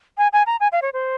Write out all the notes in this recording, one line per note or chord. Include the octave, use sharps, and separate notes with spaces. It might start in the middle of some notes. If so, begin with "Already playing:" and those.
G#5
G#5
A#5
G#5
F5
C#5
C5